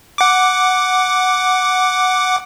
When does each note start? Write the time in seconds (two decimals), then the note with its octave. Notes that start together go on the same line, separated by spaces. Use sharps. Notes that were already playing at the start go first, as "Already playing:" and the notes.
0.18 F#5 D6